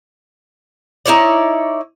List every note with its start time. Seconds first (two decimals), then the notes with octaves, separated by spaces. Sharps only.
1.06 D#4 E4 C#5 D5